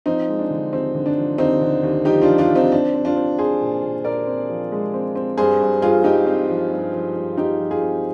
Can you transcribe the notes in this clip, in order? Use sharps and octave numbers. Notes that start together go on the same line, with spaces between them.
F3 C4 D#4
G#3
D4
D3
D#2 C4
D3
D4
F3
D#2 C4 D#4
D3
D#2
F3 D#4 G4
D4 F4
F3
D4 F4
F3
C4 D#4
C4 D4
C4
D4 F4
C4
C4 G#4 C5
A#2
A#2
A#2 A#4 D5
C4
F3
G#3
C4
C4
G2 G#4 C5
G2
G2 F4 G#4
G2 D#4 G4
C4
F3
G2
F3
G2
F3 D#4 G4
F3
F4 G#4
C4